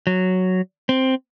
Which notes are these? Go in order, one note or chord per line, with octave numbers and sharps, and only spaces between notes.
F#3
C4